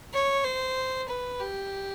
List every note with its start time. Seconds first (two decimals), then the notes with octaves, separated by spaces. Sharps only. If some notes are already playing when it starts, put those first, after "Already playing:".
0.13 C#5
0.44 C5
1.08 B4
1.39 G4